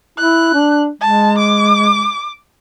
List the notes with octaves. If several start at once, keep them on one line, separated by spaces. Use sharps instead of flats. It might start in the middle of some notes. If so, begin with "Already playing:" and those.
E4 F#6
D4
G#3 A5
D6